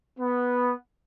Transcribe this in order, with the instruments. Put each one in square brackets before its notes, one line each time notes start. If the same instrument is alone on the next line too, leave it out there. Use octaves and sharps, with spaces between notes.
[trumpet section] B3